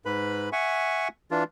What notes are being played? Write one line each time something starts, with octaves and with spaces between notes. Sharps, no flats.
G#2 B4 B5
E5 F#5 G#5 C#6
E3 D4 F4